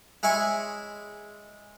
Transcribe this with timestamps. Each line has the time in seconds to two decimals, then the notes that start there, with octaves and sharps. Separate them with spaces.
0.23 G#3 E4 G#4 C#5 G#5